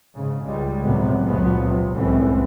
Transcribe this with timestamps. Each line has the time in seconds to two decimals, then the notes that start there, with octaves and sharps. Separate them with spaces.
0.15 G#2 C#3
0.45 C#2 G3 G#3
0.85 A1 F#2 A2 C3 F#3 B3
1.22 F1 C#2 A#2 F3 F#3 B3
1.64 C3
1.95 C2 F#2 A2 E3 G#3 C4